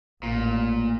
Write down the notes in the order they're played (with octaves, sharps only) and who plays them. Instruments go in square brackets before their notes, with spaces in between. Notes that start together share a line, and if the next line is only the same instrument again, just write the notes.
[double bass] A1 [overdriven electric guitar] A#2